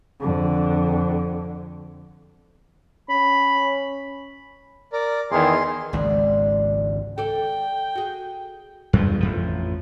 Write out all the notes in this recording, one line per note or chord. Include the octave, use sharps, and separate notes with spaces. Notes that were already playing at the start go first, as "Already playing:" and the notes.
F2 D3
C#4 B5
A#4 D5
E2 D#3 G#4 C6
G#1 C#2 G#2 D3 D5
A4 D5 G5
F#4 G#4
E2 G2 F3
A1 F2 F3